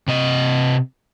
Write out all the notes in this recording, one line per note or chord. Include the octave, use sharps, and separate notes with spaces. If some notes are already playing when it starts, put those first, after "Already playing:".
C3 D#5